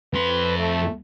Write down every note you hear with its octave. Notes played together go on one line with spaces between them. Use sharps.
F2 B4 C6
A3